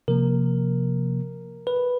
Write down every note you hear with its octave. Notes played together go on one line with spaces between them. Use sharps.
C3 F3 A#3 A#4
B4